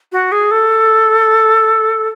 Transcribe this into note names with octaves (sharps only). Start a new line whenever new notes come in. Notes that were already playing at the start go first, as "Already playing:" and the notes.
F#4
G#4
A4